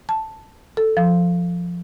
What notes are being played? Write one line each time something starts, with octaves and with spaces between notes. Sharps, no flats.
A5
A4
F3